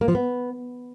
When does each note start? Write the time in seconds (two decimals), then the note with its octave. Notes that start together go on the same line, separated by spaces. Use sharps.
0.01 A#3
0.08 F3
0.15 B3